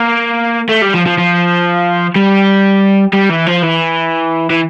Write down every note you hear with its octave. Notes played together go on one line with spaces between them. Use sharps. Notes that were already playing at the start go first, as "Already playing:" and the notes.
Already playing: A#3
A3
G3
F3
F3
F3
G3
G3
E3
F3
E3
E3